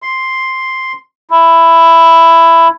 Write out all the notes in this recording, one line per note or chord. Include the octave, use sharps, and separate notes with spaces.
C6
E4